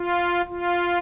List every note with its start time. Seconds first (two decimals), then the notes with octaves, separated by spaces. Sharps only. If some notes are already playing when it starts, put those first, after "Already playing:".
Already playing: F4
0.48 F4